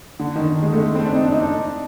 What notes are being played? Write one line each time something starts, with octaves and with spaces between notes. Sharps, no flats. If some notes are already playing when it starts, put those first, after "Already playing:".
D3
D#3
G#3
A3
C4
D4
D#4
D4
D#4
D4